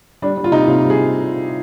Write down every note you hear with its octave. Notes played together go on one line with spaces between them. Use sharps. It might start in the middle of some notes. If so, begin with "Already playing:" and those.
G3 D4
G3
F4
C3 D#4
C3 F4
G3
G#4